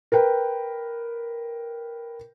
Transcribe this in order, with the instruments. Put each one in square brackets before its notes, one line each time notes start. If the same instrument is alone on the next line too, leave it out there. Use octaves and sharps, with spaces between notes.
[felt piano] A#4 B4 G5